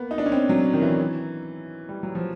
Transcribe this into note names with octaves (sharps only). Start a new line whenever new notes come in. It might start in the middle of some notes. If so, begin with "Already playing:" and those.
Already playing: A#3 B3
D#4
D4
C#4
C4
F#3
D#3
E3
G3
F#3
F3